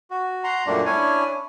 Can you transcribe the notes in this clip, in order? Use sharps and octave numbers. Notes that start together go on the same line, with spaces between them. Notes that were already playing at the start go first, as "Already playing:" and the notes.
F#4
F#5 A#5 C6
F#2 A#2 G3 A3 A#3 D4
C#4 D4 E4 C#5 G#5